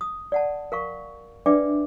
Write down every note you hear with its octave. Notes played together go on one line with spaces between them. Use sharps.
D#6
D5 F#5 A5
A#4 F5 C#6
D4 B4 D5 E5 G5 D6